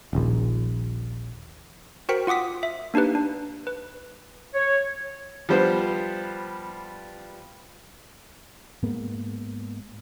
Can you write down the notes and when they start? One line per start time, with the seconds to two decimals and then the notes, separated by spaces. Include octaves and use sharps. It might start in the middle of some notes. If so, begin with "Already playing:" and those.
0.13 D#1 A#1
2.09 F#4 A#4 C5 G5 B6 C#7
2.27 F4 F#5 D6 D#6 B6
2.63 E5
2.94 A#3 D4 D#4 G4 B4
3.15 D4
3.67 B4
4.54 C#5
5.49 F3 G3 B3 C5
8.82 G#2 G#3 A#3 B3